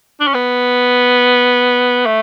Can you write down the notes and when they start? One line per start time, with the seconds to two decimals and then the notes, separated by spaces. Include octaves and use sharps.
0.20 D4
0.27 C#4
0.34 B3
2.06 A3